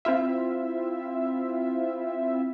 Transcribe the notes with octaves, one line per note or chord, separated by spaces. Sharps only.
C4 E4 F4 E5